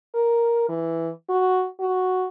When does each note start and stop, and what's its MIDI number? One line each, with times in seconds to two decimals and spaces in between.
0.15 0.65 70
0.69 1.10 52
1.29 1.67 66
1.80 2.26 66